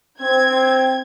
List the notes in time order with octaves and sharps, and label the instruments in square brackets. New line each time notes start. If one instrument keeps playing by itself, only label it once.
[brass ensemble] C4 [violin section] G#6